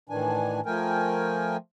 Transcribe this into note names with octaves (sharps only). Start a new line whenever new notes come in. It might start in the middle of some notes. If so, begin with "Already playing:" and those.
A2 D#3 E3 D4 G#5
F3 A3 A#4 G5 G#5